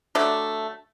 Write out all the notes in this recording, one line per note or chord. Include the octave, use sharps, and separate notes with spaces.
D3 F#3 A3 D4